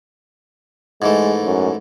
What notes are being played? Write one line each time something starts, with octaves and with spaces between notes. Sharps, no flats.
G#2 E3 G#3 A3
F#2